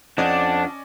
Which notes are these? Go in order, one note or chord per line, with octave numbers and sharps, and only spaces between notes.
F2 C#4 D4 D5 D#5 F#5